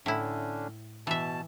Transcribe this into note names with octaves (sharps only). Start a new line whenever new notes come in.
A2 D3 C#4 D4 E4
B2 E3 E5 A5